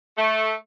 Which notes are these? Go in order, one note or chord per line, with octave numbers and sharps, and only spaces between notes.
A3